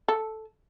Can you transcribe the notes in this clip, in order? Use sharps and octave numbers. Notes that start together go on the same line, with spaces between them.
A4